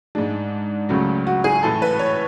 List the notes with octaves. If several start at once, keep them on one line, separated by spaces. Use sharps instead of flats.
G#2 G#3 D4
C#2 C#3 F#3 A3
F#4
G#4
A2 E3 A3 A4
B4
C#5